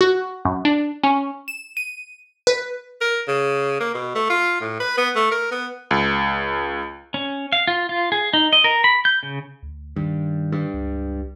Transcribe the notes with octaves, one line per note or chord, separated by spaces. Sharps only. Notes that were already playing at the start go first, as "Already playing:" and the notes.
F#4
F#2
D4
C#4
E7
D#7
B4
A#4
C#3
A#3
B2
A3
F4
A2
B4
B3
A3
A#4
B3
C#2
C#4
F5
F4
F4
G#4
D#4
D#5
A#4
B5
G6
C#3
D2
G2 D#3
G2
C#2